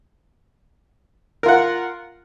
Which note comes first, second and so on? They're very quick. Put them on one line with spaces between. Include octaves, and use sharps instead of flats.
A#4 F4 F#5